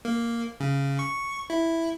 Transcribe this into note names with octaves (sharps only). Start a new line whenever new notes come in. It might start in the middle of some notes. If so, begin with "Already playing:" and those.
A#3
C#3
C#6
E4